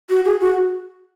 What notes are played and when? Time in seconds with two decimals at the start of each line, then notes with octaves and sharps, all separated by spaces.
0.10 F#4
0.25 G#4
0.41 F#4